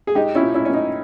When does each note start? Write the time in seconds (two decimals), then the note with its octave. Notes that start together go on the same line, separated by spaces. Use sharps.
0.07 G#4
0.15 G#3 D#4 G4
0.35 C#4 E4
0.42 A#2
0.54 C#4 E4
0.65 A#2 C#4
0.74 D#4